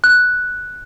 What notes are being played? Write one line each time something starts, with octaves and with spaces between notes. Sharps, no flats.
F#6